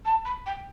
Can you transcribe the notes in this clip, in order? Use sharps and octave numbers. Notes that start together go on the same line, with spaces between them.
A5
B5
G5